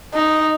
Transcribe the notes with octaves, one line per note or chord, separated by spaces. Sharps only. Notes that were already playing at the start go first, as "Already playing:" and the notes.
D#4